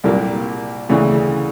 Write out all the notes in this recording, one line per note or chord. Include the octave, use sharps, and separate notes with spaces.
C2 A#2 G3 A#3
D2 C#3 E3